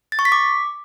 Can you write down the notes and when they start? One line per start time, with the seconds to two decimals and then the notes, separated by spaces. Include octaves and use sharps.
0.12 A6
0.19 C#6
0.25 B6
0.32 D6